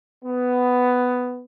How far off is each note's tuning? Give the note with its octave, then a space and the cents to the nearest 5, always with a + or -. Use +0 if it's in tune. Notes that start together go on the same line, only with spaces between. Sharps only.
B3 +10